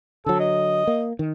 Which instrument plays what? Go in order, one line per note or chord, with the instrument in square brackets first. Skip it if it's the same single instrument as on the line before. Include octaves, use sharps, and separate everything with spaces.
[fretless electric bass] D3 F#3 [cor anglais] A4
[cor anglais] D#5
[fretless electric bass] A#3
D#3